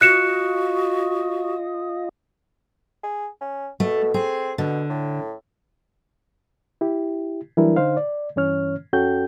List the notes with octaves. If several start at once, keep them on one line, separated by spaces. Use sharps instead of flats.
F4 F#4 D#5 F#6 C#7 E7
G#4
C#4
B2 A3
C4 G#4
B2 D3
A2
E4 G4
E3 F#3 G3 D4 E4 A#4
D3 D#4 C5 F5
D5
G2 E3 C#4 C#5 F6
F2 C#4 F#4 A4 G5 G6